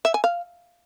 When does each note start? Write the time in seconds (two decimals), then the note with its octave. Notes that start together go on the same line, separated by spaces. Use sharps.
0.05 E5
0.14 G#5
0.24 F5